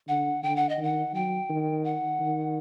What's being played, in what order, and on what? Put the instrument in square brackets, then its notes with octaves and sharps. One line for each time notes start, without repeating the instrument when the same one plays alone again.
[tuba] D3 [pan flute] F#5
[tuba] D3 [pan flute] G5
[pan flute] F#5
D#5
[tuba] D#3 [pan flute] F#5
[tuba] F#3 [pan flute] G5
[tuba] D#3
[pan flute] F#5
[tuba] D#3